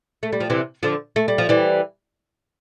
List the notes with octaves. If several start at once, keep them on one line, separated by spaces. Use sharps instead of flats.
A3
G3
F3
C3 E3
D3 F3
A3
G3
F3
E3 G3